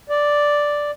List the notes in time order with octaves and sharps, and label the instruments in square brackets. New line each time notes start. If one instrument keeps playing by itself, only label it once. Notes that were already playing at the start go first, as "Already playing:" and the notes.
[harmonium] D5